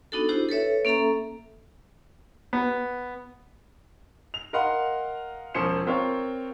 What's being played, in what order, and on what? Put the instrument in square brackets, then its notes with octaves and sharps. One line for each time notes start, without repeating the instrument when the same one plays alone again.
[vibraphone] B3 D4 D#4 F#4 A4
D4 E4 F#4 G4 C5
A4 B4 C#5 E5
A#3 C#4 A4 E5 A#5
[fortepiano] B3
[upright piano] F7
A#4 D#5 F5 F#5 C6
E1 F3 C#4 C5 C#7 E7
C4 F4 A#4 C#5